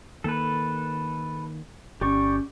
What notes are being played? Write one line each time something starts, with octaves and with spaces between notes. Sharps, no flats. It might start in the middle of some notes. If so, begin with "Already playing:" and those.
D#3 A#3 A4 B4
G1 C#4 G4 D5 C#6